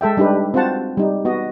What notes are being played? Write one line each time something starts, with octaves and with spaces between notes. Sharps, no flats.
G#3 A4 E5 G5
G3 D4 D#4 G4 B4
C4 F4 F#4 C5 F#5 A5
G3 D#4
B3 F#4 D#5